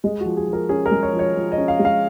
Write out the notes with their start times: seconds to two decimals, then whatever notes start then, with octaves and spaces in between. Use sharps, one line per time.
0.04 G#3 D#5
0.21 F#4
0.26 F3
0.37 G#4
0.48 F3
0.53 A#4
0.69 C#4 G#4
0.86 A#4
0.91 G#3
1.03 C#5
1.13 F3
1.19 C#5
1.36 F3
1.52 D#5
1.58 C#4
1.68 F5
1.79 G#3
1.85 F5